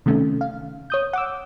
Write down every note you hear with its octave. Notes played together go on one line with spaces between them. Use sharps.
C3 D#3 A3 C#4
F5
C#5 D#6 G6
F#5 D6 E6